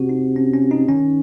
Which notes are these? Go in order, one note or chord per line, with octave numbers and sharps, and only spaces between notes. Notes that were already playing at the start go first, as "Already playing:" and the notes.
Already playing: C3 F#4
D#4
C#4
C#4
D#4
D#3 C#4